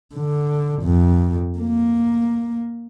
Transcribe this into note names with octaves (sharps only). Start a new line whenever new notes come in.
D3
F2
A#3